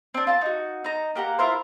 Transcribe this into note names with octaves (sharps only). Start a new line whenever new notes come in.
C4 D4
F4 A5
D#4 F#4
D#4 A#5
A#3 G4 F#5 A#5
E4 F4 A#4 C5